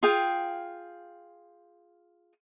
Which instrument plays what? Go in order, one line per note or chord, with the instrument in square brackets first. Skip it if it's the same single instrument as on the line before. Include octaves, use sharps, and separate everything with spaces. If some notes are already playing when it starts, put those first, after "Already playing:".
[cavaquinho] F4 G#4 F5 G5